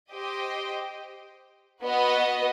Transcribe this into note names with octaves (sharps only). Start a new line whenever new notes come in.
G4 C5 D#5 G5
B3 F#4 B4 D#5